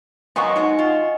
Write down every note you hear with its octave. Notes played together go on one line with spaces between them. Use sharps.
F#3 A#3 B3 D#5 G#5 C6 C#6
G#3 D#4 F#4
F4 D#5